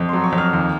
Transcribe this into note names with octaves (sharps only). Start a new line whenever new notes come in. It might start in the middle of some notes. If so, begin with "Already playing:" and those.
Already playing: F2
F#3 C6
C#6
F2
F6
D#2